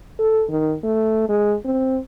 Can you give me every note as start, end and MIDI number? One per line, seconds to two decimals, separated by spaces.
0.19 0.44 69
0.49 0.74 51
0.83 1.27 57
1.29 1.55 56
1.65 1.99 60